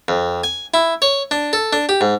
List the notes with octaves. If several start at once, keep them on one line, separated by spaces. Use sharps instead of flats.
F2
G#5
E4
C#5
D4
A4
D4
G4
G#2